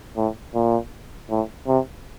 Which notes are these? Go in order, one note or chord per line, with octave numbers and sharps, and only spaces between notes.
A2
A#2
A2
C3